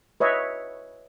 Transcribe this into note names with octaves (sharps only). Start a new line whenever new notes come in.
B4 C#5 D#5 E5